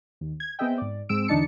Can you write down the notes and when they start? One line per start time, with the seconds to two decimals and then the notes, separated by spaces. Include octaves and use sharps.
0.21 D#2
0.40 G#6
0.59 B3 C4 G#4 D#5 E5 G5
0.78 G#2 D5
1.09 G#2 G#3 C4 E6 D7
1.28 E2 D3 D4 D#4 A5 C#7